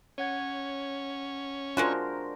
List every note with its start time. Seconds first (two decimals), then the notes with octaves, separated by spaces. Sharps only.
0.18 C#4 C#5 F#5 G#6
1.77 G#3 D4 F4 F#4 A#4 C5